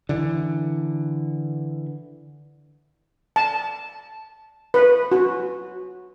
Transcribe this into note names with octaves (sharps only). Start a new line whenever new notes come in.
D3 E3
A5
B4
F#4